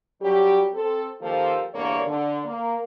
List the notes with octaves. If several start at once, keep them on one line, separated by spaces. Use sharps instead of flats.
F#3 G3 C#4 G4
C4 A4
D#3 F3 A#3 F4 G4 A4
E2 G2 D3 A#3 C#5 D5
D3
A#3